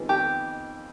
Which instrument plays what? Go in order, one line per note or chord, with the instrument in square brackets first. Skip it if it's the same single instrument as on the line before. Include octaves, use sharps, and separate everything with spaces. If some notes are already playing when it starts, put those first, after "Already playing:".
Already playing: [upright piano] F2 D#3 G#3 B3 F4
[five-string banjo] G4